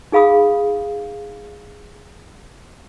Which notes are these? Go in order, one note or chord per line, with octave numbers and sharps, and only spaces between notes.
D#4 G#4 F5 B5 D#6